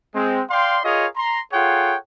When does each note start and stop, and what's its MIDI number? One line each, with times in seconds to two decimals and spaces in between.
0.15 0.41 56
0.15 0.41 60
0.50 0.79 74
0.50 0.79 77
0.50 0.79 79
0.50 0.79 84
0.85 1.07 65
0.85 1.07 68
0.85 1.07 70
0.85 1.07 73
0.85 1.07 75
0.85 1.07 77
1.16 1.41 82
1.16 1.41 84
1.53 1.97 65
1.53 1.97 68
1.53 1.97 69
1.53 1.97 73
1.53 1.97 78
1.53 1.97 79